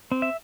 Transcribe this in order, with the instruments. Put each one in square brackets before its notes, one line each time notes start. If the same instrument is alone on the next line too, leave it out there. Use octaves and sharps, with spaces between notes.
[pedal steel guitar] C4
E5